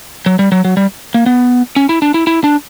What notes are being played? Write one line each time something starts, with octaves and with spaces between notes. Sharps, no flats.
F#3
G3
F#3
F#3
G3
A#3
B3
C#4
E4
D4
E4
E4
D4